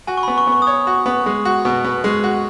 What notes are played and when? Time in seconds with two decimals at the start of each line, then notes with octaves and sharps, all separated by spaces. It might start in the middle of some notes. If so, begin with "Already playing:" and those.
0.07 F#4 G#5
0.17 C#6
0.23 B3 B5
0.38 C#6
0.47 B3
0.52 C#6
0.62 D#6
0.67 C#5 C#6
0.87 F#4
1.06 B3
1.26 G#3
1.45 F#4
1.65 B2
1.85 B3
2.04 G#3
2.24 F#4